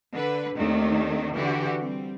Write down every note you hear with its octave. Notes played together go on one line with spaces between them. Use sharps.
D3 B4
D#2 D#3 A3 C4 D4
D3 E3 F#4 G4
G3 C4